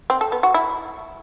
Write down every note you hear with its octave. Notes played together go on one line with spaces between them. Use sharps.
C4
A4
B3
F#4
E4